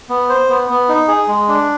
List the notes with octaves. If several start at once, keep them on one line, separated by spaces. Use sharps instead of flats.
B3
C5
B3
B3
D#4
G#4
G#3
D4